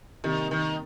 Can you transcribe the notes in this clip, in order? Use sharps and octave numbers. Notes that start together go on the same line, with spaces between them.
C3 D#3 G3 A#3 G4
D#3